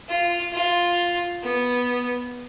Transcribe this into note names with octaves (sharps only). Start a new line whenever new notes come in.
F4
F4
B3